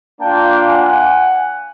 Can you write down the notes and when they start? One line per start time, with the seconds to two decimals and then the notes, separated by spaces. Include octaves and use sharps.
0.20 A#3 D4 F4 G5 A5
0.68 F#5 G#5